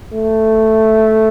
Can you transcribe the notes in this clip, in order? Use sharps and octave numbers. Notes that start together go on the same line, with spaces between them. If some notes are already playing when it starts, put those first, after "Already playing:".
A3